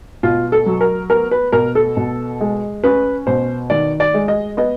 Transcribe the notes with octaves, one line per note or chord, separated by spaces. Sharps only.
B2 F4
A4
F#3
A#4
B3 A#4
B4
B2 A#4
A4
B2
G#3
C#4 B4
B2 C5
D#3 D5
D5
G#3
D#5
B3 D#5